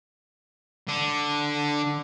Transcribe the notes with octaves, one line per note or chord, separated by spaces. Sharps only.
D3 D4